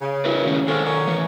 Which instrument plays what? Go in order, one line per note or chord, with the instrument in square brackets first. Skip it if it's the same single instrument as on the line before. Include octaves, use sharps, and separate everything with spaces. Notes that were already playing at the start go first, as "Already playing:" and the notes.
[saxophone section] C#3
[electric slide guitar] E4 A#4 B4
A2 D#3 C#4
[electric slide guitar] D#3 A4 [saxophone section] G#3 C4 C#4
[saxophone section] C#4 A#4 C#5
[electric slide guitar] A2 E3